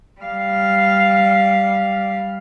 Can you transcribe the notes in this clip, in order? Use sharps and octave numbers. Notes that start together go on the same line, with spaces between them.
G3 F5